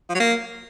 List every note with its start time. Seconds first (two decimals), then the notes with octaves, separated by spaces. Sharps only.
0.09 F3
0.15 F#3
0.20 A#3